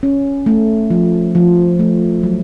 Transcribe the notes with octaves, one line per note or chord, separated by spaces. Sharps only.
C#4
A3
F3
F3
A3
F#3